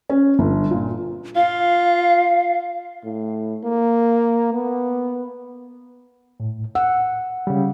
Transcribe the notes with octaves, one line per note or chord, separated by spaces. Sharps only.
C#4
G1
A#2
F4 F5
A2
A#3
B3
A2
F#5 E6
C#3 G3